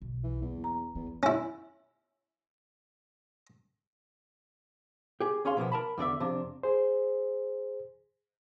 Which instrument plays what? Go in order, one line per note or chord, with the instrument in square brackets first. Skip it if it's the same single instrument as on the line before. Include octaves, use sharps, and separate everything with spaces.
[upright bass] B1
[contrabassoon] E3
[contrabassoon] E2 [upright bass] F#3 A#3
[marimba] A#5
[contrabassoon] E2 [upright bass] B3
[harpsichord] C#4 E4
[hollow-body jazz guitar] G4 G#4
D#2 C#4 G#4 C#5 F5 C6
B2 F3 A#3 B3
A#4 A5 B5
E2 D3 D5 E5
F2 C3 D4
[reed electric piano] G#4 C5